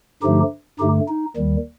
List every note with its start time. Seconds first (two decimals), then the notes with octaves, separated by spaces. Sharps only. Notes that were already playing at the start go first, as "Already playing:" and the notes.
0.22 G2 D3 F3 A3 D#4 G4
0.79 G2 D3 A3 D#4 G4
1.08 D#4
1.37 D#2 D#3 G3